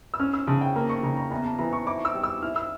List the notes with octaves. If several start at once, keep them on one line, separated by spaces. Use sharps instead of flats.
E6
C#4 F6
E6
C#3 A5
G5
A#3 A#5
C#6
C#3 A#5
A#5
E2 A#5
A5
E3 A#5
C#6
E4 D6
E6
G3
E6
E4 F6
E6